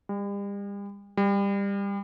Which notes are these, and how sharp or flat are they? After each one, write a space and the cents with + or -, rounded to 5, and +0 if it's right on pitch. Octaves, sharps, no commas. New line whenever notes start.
G3 +40
G3 +25